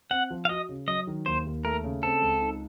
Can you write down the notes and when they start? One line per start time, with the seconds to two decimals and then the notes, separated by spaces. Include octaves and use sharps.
0.10 C4 F#5
0.30 F3
0.45 F5
0.49 F#4 D#5
0.69 C#3
0.87 F#3 D#5
1.07 D#3
1.26 D#2 C5
1.46 D#2
1.65 A3 A#4
1.84 C#3
2.03 C4 A4
2.22 C#2
2.41 D#4